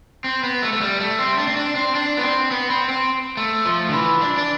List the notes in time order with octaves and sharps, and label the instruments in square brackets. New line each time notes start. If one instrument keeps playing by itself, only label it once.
[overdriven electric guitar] C4
B3
A3
A3
G3
A3
C4
D4
C4
D4
C4
D4
B3
C4
B3
C4
C4
A3
F3
D3
E3
D4
D4